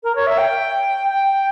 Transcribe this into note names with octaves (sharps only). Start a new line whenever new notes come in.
A#4
C#5
E5
G5
G5